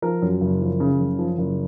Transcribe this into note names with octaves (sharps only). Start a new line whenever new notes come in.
F3 A#4
F#2
F#1
F3
C#3
F#1
F3
F#1